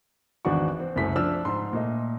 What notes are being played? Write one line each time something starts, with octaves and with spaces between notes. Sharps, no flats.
G#1 E2 D4 F#4 C#6
C4
F#1 C2 F#2 F#3 A3 B6
F3 D4 E6 F6
G#2 C6
A#2 A3 D#5